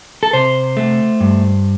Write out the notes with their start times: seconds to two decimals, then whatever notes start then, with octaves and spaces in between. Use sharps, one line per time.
0.23 A4
0.33 C3 C5
0.77 A3
1.21 G2